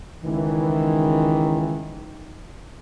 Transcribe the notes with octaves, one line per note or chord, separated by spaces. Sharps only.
C#2 D#3 E3